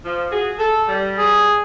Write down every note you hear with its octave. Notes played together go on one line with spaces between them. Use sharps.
F3
F#4 G#4
A4
G3
G#4